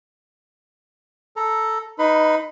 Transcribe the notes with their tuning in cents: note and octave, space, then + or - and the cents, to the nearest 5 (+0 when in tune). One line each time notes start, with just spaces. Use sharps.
A4 +0 A#5 +0
D#4 +0 B4 -5 B5 +30